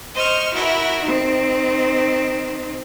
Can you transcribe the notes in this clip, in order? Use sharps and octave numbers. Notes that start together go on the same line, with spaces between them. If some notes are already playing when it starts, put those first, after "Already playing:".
C5 D#5 C#6 F6
E4 F#4 A#4 E5
D#3 C4